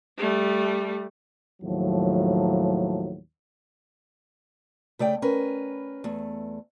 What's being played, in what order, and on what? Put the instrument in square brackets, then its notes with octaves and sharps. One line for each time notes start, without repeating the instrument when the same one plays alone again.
[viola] G3 A3
[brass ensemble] D#2 A2 F3 F#3
[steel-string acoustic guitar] C#3 A3 D5 G5
C#4 A#4 B4
E2 A3